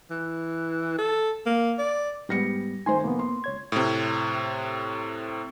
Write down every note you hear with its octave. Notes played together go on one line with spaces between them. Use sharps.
E3
A4
A#3
D5
G#2 G3 B3 G4 A#6 C#7
D#3 A3 C5 G#5 C6
F1 A#3 B3
C6
C#2 C#5 G#6
A2 C3